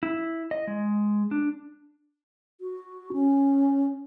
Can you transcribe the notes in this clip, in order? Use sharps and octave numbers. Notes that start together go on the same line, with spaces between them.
E4
D#5
G#3
D4
F#4
C#4